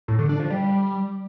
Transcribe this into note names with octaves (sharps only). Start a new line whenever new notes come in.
A2
D3
D4
F3
G3